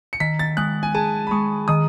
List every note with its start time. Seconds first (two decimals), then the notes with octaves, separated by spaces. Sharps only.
0.13 C#7
0.20 D#3 B6
0.39 A6
0.57 G#3 F#6
0.83 G#5
0.95 G#4 A5
1.27 B5
1.31 G#3 C#6
1.68 D#3 D#6